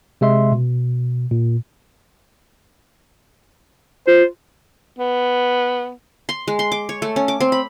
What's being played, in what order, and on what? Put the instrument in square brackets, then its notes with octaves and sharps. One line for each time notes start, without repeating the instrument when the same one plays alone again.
[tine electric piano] C3 G#3 E5 C6
B2
A#2
[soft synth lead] F4 [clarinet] C5
[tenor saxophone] B3
[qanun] C6
G#3
C6
D6
C#5
A3
C#4
D6
C4
B5